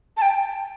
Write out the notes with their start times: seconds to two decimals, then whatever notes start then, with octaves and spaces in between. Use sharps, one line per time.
0.17 A5
0.22 G5